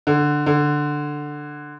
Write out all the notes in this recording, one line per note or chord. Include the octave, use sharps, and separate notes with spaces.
D3
D3